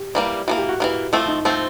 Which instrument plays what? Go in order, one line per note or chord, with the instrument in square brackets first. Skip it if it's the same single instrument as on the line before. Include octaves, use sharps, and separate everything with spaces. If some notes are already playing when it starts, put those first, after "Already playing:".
Already playing: [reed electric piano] G4
[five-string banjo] E3 G3 A#3
[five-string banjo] E3 G3 A#3 [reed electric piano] F#4
[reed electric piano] G4
F#4
[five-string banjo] E3 G3 A#3
[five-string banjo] F3 A3 C4 [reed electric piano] E4
[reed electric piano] D#4
[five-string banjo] F3 A3 C4